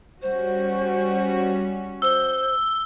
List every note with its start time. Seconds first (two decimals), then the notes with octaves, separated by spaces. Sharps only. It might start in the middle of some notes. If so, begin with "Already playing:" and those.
0.22 G3 C#4 F#4 C5
2.02 C5 E6 G7